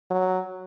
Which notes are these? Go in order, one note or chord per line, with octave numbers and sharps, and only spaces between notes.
F#3